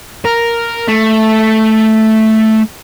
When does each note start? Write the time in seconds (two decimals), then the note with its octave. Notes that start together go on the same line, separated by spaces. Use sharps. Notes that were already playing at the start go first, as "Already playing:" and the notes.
0.25 A#4
0.89 A3